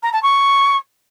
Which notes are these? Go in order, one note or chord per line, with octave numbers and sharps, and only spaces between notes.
A#5
A5
C#6